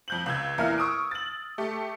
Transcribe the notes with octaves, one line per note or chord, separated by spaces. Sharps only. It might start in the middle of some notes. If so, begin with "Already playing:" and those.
F2 G6 F#7
C#2 E6 G#6
E2 A#2 E4 A#4 F5 F6
C#6 D#6 E6 D7
A6 F#7
A3 G4